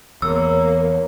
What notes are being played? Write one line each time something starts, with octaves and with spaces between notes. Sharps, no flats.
E2 A#3 C#5 E6